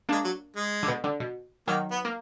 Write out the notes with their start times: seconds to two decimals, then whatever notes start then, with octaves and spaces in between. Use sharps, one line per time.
0.09 G#3 A#3 D4
0.25 F#3
0.56 G#3
0.83 D3
0.88 B2
1.04 D3
1.20 B2
1.68 D#3 F#3 A#3
1.91 B3
2.05 A#3